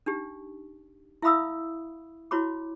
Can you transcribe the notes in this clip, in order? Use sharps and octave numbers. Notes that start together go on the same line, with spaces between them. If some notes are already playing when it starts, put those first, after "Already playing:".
D4 D#4 G4
E4 E5 F5 B5 D#6 E6
E4 F#4 C#5 B5 D6